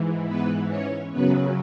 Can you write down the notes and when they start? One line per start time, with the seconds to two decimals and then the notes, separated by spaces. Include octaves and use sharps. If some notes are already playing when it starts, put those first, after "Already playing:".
Already playing: G#2 E3
0.27 B3 B4
0.69 C#4 C#5
1.12 F#2 C#3 F#3 B3 B4